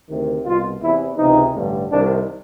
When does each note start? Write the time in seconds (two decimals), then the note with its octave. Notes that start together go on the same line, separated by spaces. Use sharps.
0.09 D2 C3 D#3
0.45 C2 B2 F4
0.81 E2 C3 E3 E4
1.17 C#2 C3 E3 D#4
1.54 A1 G2 D3
1.90 C2 C3 D#3 D4